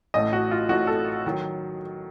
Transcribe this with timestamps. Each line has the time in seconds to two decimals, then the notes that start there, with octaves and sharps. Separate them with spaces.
0.14 A1 A2 A3 D#5
0.33 F#4
0.51 F4
0.69 A1 A2 A3 F#4
0.87 A4
1.26 D#3 F#3